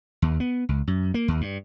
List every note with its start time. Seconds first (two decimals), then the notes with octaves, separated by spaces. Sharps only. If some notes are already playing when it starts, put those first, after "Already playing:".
0.22 D#2
0.40 B3
0.69 C#2
0.87 F#2
1.14 A#3
1.28 D#2
1.41 G2